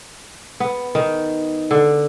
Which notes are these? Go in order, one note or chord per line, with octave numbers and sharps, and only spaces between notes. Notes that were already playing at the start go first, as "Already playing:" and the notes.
B3
D#3
D3